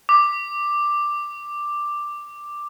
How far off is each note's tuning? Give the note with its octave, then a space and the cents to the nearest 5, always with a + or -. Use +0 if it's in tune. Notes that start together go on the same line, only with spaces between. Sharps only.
D6 +5